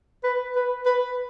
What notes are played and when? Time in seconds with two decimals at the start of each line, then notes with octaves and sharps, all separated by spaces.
0.24 B4
0.56 B4
0.86 B4